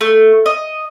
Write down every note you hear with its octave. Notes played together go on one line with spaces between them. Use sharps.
A3
D#5